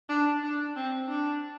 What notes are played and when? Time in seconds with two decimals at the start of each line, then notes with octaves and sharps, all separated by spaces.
0.09 D4
0.43 D4
0.76 C4
1.08 D4